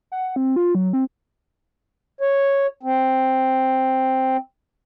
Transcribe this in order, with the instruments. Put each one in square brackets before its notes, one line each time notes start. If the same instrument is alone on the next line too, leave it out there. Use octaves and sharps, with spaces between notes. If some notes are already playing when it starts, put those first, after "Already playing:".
[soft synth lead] F#5
C4
F4
F#3
C4
[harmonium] C#5
C4